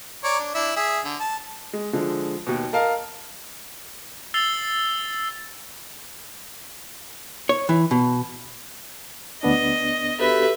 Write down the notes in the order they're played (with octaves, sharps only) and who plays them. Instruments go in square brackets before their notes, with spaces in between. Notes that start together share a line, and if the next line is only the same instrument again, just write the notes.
[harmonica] C#5 D5 A#5
D4
D4 E4 E5
G#4 E5
D3
A5
[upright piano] G#3
D3 F3 G#3
D#2 B2
A#4 D#5 F5 A5
[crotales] E6 A6 C7 F7 G7
[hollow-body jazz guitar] C#5
E3
B2
[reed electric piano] D2 B3 D4 [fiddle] D#5
[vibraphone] F#4 G4 A4 [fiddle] B4 E5